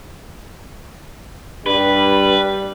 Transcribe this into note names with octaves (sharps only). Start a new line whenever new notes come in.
G2 G3 B4